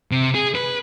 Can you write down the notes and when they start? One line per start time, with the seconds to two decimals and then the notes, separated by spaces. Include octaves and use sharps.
0.11 C3
0.35 G#4
0.55 B4